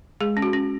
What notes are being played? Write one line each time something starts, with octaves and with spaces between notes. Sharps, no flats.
G#3 G#4
C#4
F#4
C#4